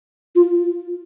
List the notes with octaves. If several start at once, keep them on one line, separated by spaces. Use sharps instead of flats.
F4